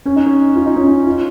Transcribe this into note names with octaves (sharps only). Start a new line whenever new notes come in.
C#4
D#4
C#4
F4
D#4
C#4
D#4
F4